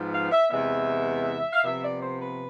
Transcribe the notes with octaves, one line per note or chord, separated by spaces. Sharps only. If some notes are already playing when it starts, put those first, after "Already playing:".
Already playing: G#2 F3 B3
F5
E5
E2 C3 E3 G#3 B3 E5
F5
C3 F3 B3 E5
D5
C5
B4